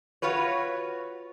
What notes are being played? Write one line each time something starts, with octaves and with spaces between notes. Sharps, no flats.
F4 F#4 B4 C#5